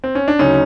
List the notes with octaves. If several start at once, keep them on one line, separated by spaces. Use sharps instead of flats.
C4
C#4
D4
D2 C#3 F#3 C#4 D#4